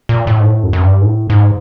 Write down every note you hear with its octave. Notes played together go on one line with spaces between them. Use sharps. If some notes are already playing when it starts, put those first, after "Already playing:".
A#2
A2
G#2
A2
F#2
F#2
G2
G#2
A2
G#2